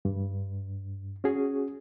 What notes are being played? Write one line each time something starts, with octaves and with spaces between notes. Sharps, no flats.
G2
C#4 F#4 G#4